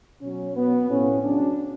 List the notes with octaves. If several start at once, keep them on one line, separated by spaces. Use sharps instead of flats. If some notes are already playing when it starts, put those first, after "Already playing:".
B2 F#3 C#4
B2 F#3 B3
A2 F3 C#4
C#3 F#3 D4